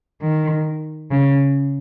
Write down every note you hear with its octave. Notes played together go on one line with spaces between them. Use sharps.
D#3
C#3